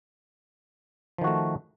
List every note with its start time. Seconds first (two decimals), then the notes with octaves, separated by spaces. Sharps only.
1.18 F3
1.21 D#3
1.24 F#4
1.27 A3